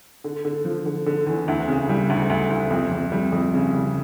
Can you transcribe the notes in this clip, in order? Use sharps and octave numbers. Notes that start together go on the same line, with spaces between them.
D3
D3
F3
D3
D3
E2
D2
C#3
G3
D2
D2
D2
F2
F2
G3
F2
C#3
G3